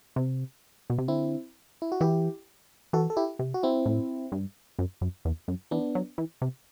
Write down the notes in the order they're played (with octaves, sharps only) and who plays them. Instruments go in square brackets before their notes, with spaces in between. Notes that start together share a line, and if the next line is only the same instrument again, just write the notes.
[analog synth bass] C3
B2
C3
[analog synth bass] D3 [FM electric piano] C4 E4
[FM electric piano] E4
F#4
[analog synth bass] E3 [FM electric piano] E4 G4
[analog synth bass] E3 [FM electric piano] F#4 A4
[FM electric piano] A4
E4 G4
[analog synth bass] C3
[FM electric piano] F#4
C4 E4
[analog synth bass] A2
G2
F#2
F#2
E2
F#2
[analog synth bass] E3 [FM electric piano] B3 D4
[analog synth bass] F#3
E3
C3